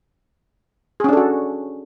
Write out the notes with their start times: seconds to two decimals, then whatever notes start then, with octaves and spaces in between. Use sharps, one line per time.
1.00 G#4
1.04 C#4
1.09 D4
1.13 A4
1.17 F#4